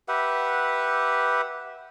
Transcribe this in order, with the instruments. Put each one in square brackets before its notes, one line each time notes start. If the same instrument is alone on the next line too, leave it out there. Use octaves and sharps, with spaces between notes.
[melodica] G4 B4 E5 F#5